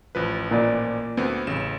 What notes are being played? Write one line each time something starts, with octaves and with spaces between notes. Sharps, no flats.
A1 F3 B4
A#2 D5
D2 B3 C4
A1 C#3 E7